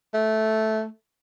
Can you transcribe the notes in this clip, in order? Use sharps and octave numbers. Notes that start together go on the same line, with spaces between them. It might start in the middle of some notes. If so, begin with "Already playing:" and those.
A3